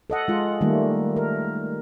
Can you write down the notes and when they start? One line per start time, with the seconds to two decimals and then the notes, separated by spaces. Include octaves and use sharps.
0.10 A4 D#5 F#5
0.28 G#3 F4
0.61 D#3 G3 A3 A#3
1.16 A#4